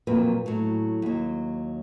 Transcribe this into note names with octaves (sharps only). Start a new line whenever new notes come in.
F2 A#2 F#3 A#3 B4
A2 F#3
D#2 F#3